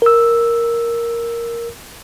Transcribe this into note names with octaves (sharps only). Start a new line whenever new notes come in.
A#4 E6